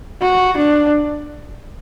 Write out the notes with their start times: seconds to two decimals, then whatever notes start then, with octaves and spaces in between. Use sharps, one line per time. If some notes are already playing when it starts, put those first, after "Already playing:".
0.21 F#4
0.57 D4